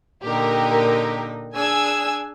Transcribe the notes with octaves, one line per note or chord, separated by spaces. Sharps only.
A#2 D3 D#4 G4 A#4
D4 G#4 G#5 E6 G#6